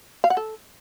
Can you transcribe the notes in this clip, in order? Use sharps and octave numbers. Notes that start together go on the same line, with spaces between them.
F5
F#5
A4